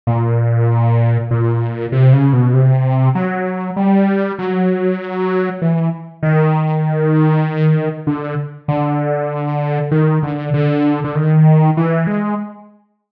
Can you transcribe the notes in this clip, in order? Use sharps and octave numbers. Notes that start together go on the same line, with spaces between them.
A#2
A#2
C3
C#3
B2
C3
F#3
G3
F#3
E3
D#3
D3
D3
D#3
D3
D3
D3
D#3
E3
G#3